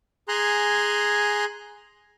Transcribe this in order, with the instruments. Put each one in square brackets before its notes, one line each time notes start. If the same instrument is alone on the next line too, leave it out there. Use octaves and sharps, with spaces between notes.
[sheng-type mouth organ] G#4 G#5 A#5 C6 F#6